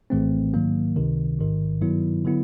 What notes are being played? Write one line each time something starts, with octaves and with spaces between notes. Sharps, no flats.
A#1 A2 E3 A3 C4
G#2 D#3 F#3 A#3
C#2 C3 D#3
A1 G#2 D#3
G2 D#3 F#3 B3 E4
D3 F#3 B3 E4